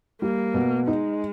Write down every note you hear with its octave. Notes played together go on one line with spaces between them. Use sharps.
G3 A#3
B2
G#3 D#4